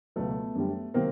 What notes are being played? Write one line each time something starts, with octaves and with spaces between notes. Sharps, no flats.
C#2 B2 F#3 A3 B3
F#2 D3 G3
C3 D#3 F#3 A#3 C4